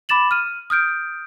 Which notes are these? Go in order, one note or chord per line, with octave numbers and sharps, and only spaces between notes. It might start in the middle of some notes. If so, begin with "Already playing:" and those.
B5 D6 A6 E7 F#7
F6 D#7
D#6 F6 G6 D7